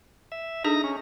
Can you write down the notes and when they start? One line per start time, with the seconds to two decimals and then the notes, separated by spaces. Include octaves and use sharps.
0.32 E5
0.64 D4 D#4 G#4 A4 A#6
0.84 C#4